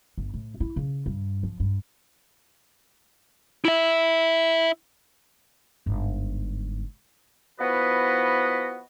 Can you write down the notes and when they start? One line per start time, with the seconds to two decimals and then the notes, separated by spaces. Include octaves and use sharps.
0.18 G1
0.34 A2
0.60 E4
0.76 C#3
1.06 G2
1.43 F3
1.60 G2
3.65 E4 E5
5.86 G1 G#2
7.60 F3 B3 E4 F#4 B4 D#5